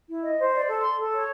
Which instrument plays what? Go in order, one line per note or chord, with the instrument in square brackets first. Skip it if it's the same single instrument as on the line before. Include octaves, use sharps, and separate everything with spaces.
[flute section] E4
D#5
C5
D5
A4
C6
A4
C#5